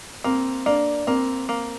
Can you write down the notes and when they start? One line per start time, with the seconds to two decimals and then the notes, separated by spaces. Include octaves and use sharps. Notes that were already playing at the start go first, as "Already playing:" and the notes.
0.24 A#3 C4
0.66 A#3 D4
1.07 A#3 C4
1.49 A#3